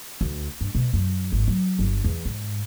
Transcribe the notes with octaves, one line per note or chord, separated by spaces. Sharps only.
D2
G2
B2
F#2
G#1
F#3
G1
E2
G#2